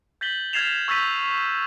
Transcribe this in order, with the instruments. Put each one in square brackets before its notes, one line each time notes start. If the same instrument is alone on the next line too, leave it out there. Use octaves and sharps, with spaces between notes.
[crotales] G6 A6 B6 F#7 G7
F6 G#6 A6 C7 E7 F7
C#6 E6 G6 A6 B6 D#7